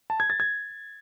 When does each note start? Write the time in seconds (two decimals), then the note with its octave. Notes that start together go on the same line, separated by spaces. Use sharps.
0.10 A5
0.20 G#6
0.30 A6
0.40 G#6